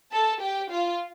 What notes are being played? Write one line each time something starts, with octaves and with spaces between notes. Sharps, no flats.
A4 A5
G4 G5
F4 F5